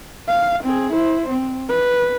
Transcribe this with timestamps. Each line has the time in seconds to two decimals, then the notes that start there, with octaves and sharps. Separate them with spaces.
0.28 F5
0.64 C4 G#4
0.93 E4 C5
1.29 C4
1.69 B4